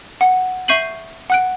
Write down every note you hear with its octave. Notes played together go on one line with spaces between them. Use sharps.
F#5
E5 C#6 G6 C7 D#7 F#7
F#5 F#6 D7